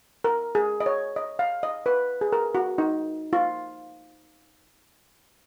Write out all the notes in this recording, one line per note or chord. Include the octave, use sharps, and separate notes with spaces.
A#4
G#4
D#5
C#5
D#5
F5
D#5
B4
G#4
A#4
F#4
D#4
F4